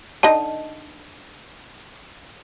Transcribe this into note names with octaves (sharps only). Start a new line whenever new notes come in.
D3 D#4 D#5 A5